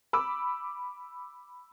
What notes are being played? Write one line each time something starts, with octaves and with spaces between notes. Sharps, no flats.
B5 D6 E6